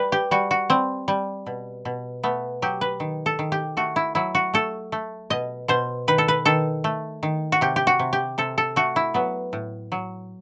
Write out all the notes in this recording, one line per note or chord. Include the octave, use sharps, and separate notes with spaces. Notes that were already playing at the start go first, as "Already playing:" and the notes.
Already playing: G3 B4
G4
G3 F#4
F#4
G3 C4
G3
B2
B2
A3 B3
F#3 G4
B4
D#3
A4
D#3
G4
A3 F#4
E4
F#3 E4
F#4
A3 A4
A3
B2 D#5
B2 C5
D#3 B4
A4
B4
D#3 A4
A3
D#3
F#4
C3 G4
G4
F#4
C3
G4
C3 A4
A4
A3 F#4
E4
F#3 B3
A2
F#3